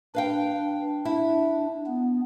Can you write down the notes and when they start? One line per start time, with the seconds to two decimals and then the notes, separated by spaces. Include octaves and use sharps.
0.15 D4 B4 F5 G5
1.05 E4
1.86 B3